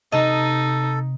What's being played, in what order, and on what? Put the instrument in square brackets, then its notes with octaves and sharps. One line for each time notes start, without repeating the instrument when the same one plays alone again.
[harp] C3 [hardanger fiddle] D#4 [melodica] A4 [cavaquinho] D#5 A5 A#5